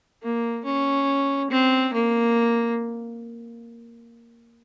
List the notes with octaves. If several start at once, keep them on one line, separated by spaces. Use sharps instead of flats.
A#3
C#4
C4
A#3